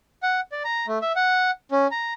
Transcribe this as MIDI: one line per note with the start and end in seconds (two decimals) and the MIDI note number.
0.23 0.40 78
0.52 0.63 74
0.65 0.86 82
0.87 0.98 57
1.02 1.12 76
1.16 1.51 78
1.71 1.87 61
1.91 2.13 82